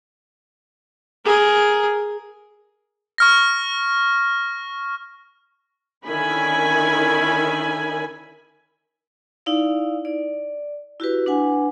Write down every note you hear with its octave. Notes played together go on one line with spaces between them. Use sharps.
G#4 A#4
C#6 F6 A#6
D3 D#3 C#4 E4 G#5 B5
D#4 E4 D5 F5
D5
E4 F#4 G4 B4
D4 B4 F#5 G#5